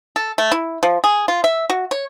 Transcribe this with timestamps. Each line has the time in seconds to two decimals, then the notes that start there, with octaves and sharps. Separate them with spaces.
0.16 A4
0.38 A3
0.52 E4
0.83 F3
1.04 G#4
1.28 F4
1.44 E5
1.70 F#4
1.91 C#5